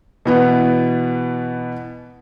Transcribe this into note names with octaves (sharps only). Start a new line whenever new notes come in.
B2 E3 B3